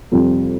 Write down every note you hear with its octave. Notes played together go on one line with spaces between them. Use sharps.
F2 C3 G3 C4 F4